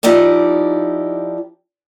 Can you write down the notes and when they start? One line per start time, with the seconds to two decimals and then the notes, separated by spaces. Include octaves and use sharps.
0.03 F3 D#4 E4 G4 D5